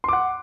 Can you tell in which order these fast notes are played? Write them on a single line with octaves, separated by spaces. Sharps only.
C6 D6 F#5